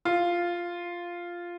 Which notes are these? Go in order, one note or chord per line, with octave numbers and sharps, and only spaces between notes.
F4